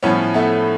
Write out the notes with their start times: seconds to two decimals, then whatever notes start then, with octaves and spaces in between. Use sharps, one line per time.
0.03 A2 F3 B3 C#4
0.34 A3 B3